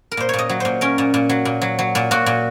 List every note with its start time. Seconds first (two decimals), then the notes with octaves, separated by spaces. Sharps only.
0.12 A#4
0.17 A#2 C5
0.29 A#2 C#5
0.39 D#5
0.49 F#3
0.60 A#2 C5
0.81 C#4 A#4
0.98 A#2
1.14 A#2
1.29 F#3
1.45 A#2
1.62 F#3
1.79 F#3
1.95 A#2
2.11 A#2 F#4
2.26 A#2